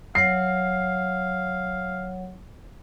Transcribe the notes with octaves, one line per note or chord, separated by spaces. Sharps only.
F#3 C#5 F5 F#5 C7